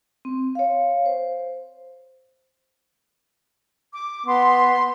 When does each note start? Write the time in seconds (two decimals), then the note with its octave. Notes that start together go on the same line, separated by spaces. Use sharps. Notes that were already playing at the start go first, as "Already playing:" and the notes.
0.25 C4
0.55 C#5 F5
1.06 C5
3.93 D6
4.26 B3 C6